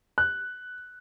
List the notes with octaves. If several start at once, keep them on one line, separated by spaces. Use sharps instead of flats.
F#6